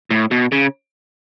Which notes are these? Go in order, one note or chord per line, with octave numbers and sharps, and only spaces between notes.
A2
B2
C#3